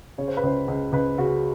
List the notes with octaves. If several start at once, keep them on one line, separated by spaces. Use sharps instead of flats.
C#3 C#5
C5
B4
C#2 C5
C#2
C#2 B4
C#3 F#4